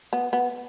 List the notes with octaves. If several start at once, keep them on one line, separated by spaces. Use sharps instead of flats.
B3
B3